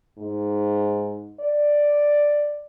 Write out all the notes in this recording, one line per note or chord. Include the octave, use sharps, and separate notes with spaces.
G#2
D5